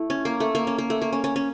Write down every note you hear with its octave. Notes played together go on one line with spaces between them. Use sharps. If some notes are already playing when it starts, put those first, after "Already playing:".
Already playing: A3 E4
C#4
A#3
A3
A#3
C#4
A#3
A3
A#3
C#4
C#4
C#4